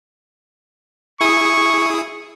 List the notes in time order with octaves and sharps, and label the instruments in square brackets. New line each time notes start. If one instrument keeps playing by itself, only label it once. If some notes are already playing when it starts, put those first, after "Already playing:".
[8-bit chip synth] E4 G#4 D#6 [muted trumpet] C#6